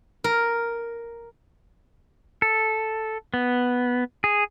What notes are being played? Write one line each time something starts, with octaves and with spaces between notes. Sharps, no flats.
A#4
A4
B3
G#4